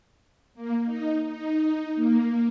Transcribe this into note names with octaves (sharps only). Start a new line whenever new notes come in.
A#3
D#4
D#4
A#3